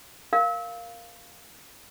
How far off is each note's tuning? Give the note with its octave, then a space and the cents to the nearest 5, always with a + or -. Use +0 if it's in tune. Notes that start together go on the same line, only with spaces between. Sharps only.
A#4 +0 F5 +0